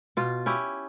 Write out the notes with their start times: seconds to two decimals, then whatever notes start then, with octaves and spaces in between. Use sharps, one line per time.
0.17 B2 F4
0.46 C#4 E4 G4